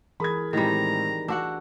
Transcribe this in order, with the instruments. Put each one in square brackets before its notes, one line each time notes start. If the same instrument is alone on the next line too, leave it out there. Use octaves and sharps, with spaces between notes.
[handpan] E3 G#4 A#4 [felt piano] B5 D#6 G#6
[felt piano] A2 G#3 C4 [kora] D#3 G3 [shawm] A#5
[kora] D4 F#4 F#5 [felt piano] E6